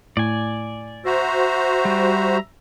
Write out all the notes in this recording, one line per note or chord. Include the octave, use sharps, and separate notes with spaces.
A2 D5 G#5
F#4 C5 E5 A#5
G3